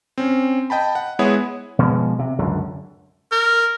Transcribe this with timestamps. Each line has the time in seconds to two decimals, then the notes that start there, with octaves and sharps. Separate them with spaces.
0.18 C4 C#4
0.70 D#5 G5 A5 B5
0.95 F#5
1.19 G#3 B3 E4 G#4 C#5 F#5
1.79 B2 F3 G#3
2.19 C3
2.39 C#2 F#2 D3
3.32 A#4